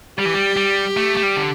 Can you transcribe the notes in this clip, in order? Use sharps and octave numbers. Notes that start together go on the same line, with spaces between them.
G3 G4
E3
G3
G3
A3
A3
G3
D3